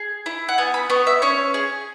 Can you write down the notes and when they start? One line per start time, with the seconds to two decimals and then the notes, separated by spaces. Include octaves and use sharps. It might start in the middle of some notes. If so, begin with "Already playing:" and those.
Already playing: G#4
0.26 E4
0.49 F#5
0.58 B3 G#5
0.74 B5
0.90 B3 C#6
1.07 E5
1.22 C#4 C#5
1.54 G#4